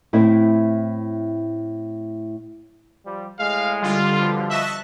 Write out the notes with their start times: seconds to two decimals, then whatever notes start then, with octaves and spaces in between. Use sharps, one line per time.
0.13 A2 C4 E4
3.06 F3 G3
3.39 A2 G#3 F5
3.82 D3 G3 F4
4.20 B2 F3
4.51 D#5 E5 A5 C#6 F#6